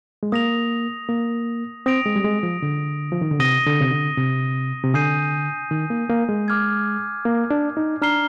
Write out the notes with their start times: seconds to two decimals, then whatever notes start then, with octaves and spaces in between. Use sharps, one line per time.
0.23 G#3
0.32 A#3 D#6 A#6 F7
1.09 A#3
1.86 C4 D#6 A#6 D7 F7
2.06 G#3
2.16 G3
2.24 G#3
2.43 F3
2.62 D3
3.12 F3
3.21 D#3
3.31 D3
3.39 C3 D#6 A#6 D#7 G7
3.66 D3
3.81 C3
3.91 D3
4.18 C3
4.84 C3
4.94 D3 G#5 D#6 G6 C7 D#7
5.71 D#3
5.90 A#3
6.10 A#3
6.29 G#3
6.48 D6 F6 G#6
7.25 A#3
7.51 D4
7.77 D#4
8.01 D4 A#5 F6 C7 G7